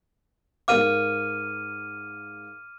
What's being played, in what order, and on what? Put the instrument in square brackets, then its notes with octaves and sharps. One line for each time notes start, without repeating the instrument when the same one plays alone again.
[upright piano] G#2 A#4 F5 [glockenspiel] D6 F6 D#7